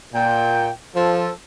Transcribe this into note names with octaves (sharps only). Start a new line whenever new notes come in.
A#2 G5
F3 A4